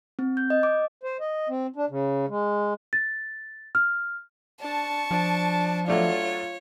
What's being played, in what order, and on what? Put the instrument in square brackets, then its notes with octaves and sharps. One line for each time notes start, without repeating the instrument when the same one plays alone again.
[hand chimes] C4
G6
D#5
D6
[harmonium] C5
D#5
C4
D4
C#3
G#3
[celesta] A6
F6
[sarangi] D4 [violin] A5 C#6
[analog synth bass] F3 [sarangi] D4
[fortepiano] F#3 A3 D4 [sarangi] F4 [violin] C#5